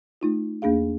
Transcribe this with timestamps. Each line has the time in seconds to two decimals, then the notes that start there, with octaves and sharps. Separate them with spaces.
0.21 A3 D#4 F4
0.62 E2 A#3 D4 G#4 F5